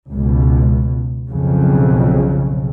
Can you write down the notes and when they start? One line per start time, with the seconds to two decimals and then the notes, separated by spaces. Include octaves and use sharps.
0.13 C#2 B2
1.28 B1 F2 C#3